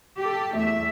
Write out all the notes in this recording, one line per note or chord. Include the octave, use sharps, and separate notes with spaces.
G4 A4
E2 A3 E5